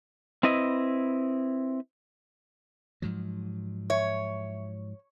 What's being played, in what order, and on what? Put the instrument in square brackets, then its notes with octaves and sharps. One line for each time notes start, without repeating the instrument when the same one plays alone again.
[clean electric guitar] C4 E4 B4 D#5
[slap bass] G#2 F3 F#3
[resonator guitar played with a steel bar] C#5 [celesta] E5